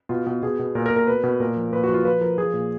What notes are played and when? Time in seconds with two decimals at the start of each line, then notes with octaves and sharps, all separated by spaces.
0.09 B2 F4
0.27 B2
0.42 B2 G#4
0.59 B2
0.75 A#2 A#4
0.86 A#4
0.91 A#2
0.96 A#4
1.07 B2 B4
1.23 B2
1.40 A#2 A#4
1.56 F3
1.72 A#2 B4
1.84 F#4
1.89 F3
1.94 F4
2.05 F3 B4
2.21 F3 A#4
2.38 F3 G#4
2.53 A#2